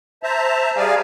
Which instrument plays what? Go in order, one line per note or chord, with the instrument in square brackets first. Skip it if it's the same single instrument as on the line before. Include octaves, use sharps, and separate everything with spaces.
[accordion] C5 E5 A5 A#5
G3 G#4 D5 F5 G#5